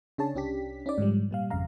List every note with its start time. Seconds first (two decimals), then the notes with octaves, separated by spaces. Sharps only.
0.18 C#3 D4 G#4 C#5 A5
0.34 C2 C#4 D4 G4 B6
0.86 C#4 D#4 D5
0.98 G#2 D3 F3 G3
1.31 A#2 G3 F5
1.50 G#1 F2 C#3 F5 A#5